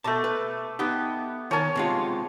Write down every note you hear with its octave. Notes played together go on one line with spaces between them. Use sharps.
B2 A3 A5 D6
B4
B3 D#4 G4
D#3 A#4 C#5 G#5 A5
C3 G#3 F4